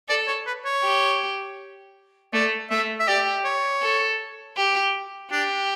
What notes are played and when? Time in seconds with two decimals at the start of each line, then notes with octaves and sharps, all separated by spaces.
0.09 A4 D5
0.27 C#5
0.46 B4
0.65 C#5
0.83 G4
2.33 A3 D5
2.70 A3 E5
3.00 E5
3.08 G4 D5
3.45 C#5
3.82 A4
4.57 G4
5.31 D4 G4